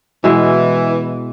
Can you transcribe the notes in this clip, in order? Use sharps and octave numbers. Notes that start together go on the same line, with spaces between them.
B2 E3 G#3 E4